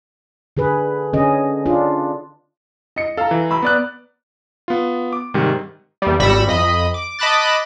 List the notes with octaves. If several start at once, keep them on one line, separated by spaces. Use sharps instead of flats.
D3 G#4 B4
D3 C#4 G#4 D#5
D4 F4
D#5 C#7
A4 F5 A#5
E3
A#5 B5 E6
B3 D5 F#6
B3 F4
D6
G#2 C3 D#3 G3
E2 G3
G#1 G3 B5 C#6 E6 A#6
F2 D#5 B5
D6
D#5 A5 B5 D6 F#6 A6